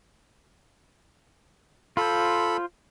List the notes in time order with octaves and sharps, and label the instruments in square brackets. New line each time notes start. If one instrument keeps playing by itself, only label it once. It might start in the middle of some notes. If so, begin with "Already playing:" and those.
[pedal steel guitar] F4 C5 [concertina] A4 B5